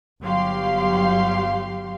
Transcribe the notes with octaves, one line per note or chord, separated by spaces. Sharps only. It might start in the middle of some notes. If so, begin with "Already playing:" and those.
G1 F#3 G4 F5 C6